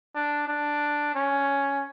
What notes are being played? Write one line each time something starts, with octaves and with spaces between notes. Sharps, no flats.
D4
D4
C#4